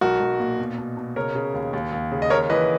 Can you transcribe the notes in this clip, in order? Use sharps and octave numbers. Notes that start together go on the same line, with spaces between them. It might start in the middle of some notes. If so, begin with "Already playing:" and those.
B1 F#4 A#4
B1
A#2
B2
B2
B2
C#3 A#4 C#5
C#3
D#2
D#2
D#2
C#3
D#5
D#2 A#4 C#5
E3 B4 D#5